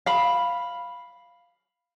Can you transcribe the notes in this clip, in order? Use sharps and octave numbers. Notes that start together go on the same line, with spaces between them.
F5 B5